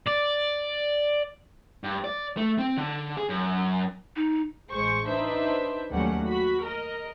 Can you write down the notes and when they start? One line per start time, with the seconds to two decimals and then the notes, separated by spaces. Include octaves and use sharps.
0.07 D5
1.84 G2
2.04 D5
2.37 A3
2.59 C4
2.77 D3
3.17 G#4
3.29 F#2
4.16 D#4
4.70 A1 G#3 C5 C#6
5.07 D4 D#4 B4 C5 E5
5.91 D#2 F#3 G3 A3 C#4 F#5
6.25 F#4 B5
6.62 A#4 D#5